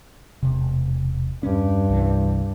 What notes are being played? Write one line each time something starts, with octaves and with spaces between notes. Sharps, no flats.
E1 C3
E2 G2 C#4
C2 E3